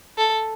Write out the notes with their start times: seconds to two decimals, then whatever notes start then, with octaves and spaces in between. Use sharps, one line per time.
0.18 A4